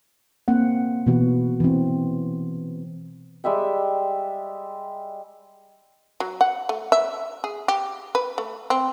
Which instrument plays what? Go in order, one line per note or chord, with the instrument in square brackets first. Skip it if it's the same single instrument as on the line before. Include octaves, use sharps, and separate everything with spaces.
[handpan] A#3 C4 F#5
B2 E3 B3 F#4
E3 C4
[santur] G3 G#3 E5 G5
[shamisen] F#3
F#5
A3
E5
G#4
G4
B4
A3
C4